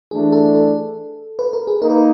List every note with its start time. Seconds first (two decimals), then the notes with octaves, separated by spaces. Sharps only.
0.11 E3 A3 D4 G#4
0.32 A4
0.55 A4
1.39 B4
1.53 A#4
1.67 G#4
1.81 A#3 D#4 A#4
1.90 B4